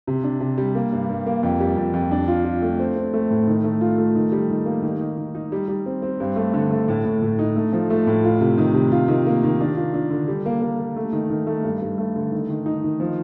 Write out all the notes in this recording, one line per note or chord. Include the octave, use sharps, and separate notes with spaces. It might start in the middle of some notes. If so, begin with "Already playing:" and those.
C3
D4
C3
G3
A#3
G2
G2
A#3
F2
G3
F2
F2
D4
F4
F4
A3
C4
C4
A3
A2
D#3
A3
F4
A3
D#3
G3
D#3
A#3
D#3
D#4
D#3
D#4
G3
G3
C4
C4
G2
A3
D3
A3
A2
A2
A2
D#4
A3
F3
A3
A2
F4
C3
D#3
C3
F4
D#3
A#3
D#3
D4
F4
D4
D3
G3
A#3
A#3
A#3
A3
D#3
D#3
A3
G2
G2
A3
D3
D#3
D#3
D#4
D#3
F3